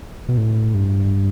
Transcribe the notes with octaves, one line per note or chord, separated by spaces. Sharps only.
B2
A2
G2